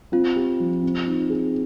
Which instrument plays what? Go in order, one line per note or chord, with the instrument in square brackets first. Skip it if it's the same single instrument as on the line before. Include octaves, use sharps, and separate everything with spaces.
[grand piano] C4 [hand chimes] F4
[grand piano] G4
F3
C4
D#4
G#4